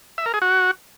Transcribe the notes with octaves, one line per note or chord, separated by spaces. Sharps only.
E5
A#4
G#4
F#4